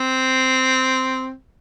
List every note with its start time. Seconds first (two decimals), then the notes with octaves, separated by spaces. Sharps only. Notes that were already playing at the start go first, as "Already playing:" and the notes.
Already playing: C4